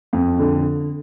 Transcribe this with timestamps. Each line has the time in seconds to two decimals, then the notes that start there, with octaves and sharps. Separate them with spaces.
0.13 F2
0.39 D3